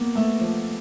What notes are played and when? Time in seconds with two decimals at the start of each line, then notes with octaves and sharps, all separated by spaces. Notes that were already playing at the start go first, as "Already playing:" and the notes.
Already playing: A#3 B3
0.15 A3
0.40 F3